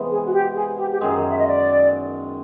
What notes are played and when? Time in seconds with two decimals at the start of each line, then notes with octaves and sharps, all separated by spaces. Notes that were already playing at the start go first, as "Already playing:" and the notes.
Already playing: C3 E3 G#3 B3
0.10 G#4
0.26 F#4
0.33 G4
0.55 G#4
0.78 G4
0.92 G4
1.00 F#2 D#3 G#3 G#4
1.29 E5
1.38 D#5
1.47 D5